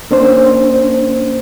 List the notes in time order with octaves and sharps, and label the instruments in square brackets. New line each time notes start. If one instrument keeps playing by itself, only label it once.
[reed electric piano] A#3 C#4 D4 C5